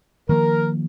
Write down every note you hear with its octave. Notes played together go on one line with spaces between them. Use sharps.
D#3 F3 A#3 A#4